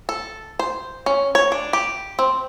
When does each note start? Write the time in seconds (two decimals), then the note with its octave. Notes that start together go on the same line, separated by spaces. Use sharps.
0.09 A4
0.59 C5
1.06 C#4
1.35 C#5
1.52 D4
1.73 G4
2.19 C4